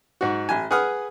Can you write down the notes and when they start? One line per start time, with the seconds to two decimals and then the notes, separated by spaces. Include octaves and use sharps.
0.21 G#2 F#4
0.49 A1 G#5
0.71 G#4 B4 F#5 D#6 F6